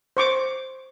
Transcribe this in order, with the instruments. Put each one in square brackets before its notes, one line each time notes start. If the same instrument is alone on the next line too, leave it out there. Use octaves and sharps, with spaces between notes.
[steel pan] C5 C#6 D6